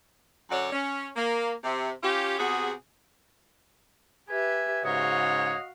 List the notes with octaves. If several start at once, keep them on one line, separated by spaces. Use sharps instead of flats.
F#2 D3 F#4 C#5 D5
C#4
A#3
C3
C#4 F4 G4
C3 B3 F#4 G#4
G4 B4 E5 G#5
G#2 C#3 F#4 C#5 D#5 F5